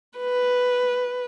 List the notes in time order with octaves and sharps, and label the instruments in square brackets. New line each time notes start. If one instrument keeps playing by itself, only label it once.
[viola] B4